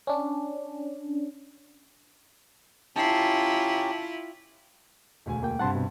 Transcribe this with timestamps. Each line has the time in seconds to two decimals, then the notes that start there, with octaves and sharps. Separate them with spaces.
0.07 C#4 D4
2.96 C#4 E4 F4 G4 A5 A#5 C7
5.26 E1 D2 G#5
5.43 A#3 G5
5.59 G2 C3 G3 F#5 A5 C6
5.75 B2